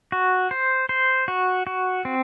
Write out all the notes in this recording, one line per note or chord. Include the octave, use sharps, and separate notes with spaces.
F#4
C5
C5
F#4
F#4
C4